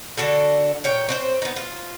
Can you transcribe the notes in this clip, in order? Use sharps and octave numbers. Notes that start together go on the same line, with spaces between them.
D3 D4 F#4 A4
A#2 C#5 G5
C4 D4 C5
B3 D#4
F4